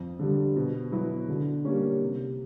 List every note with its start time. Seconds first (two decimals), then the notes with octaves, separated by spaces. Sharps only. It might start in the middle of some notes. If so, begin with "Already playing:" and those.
Already playing: F2
0.19 D3 G3
0.56 B2
0.92 F#3 B3 E4
1.28 D3
1.65 G3 A#3 C#4
2.01 C3